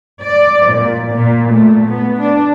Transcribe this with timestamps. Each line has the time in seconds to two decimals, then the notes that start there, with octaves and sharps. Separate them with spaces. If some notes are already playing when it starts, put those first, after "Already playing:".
0.24 D5
0.69 A#2
1.12 A#2
1.51 A3
1.90 B3
2.20 D4